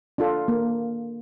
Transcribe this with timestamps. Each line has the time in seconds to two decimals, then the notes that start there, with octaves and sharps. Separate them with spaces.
0.18 D4 F4 A4
0.48 A#3